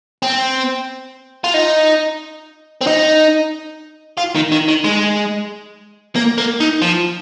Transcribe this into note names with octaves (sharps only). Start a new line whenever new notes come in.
C4
F4
D#4
C4
D#4
F4
D#3
D#3
D#3
G#3
A#3
A#3
D#4
F3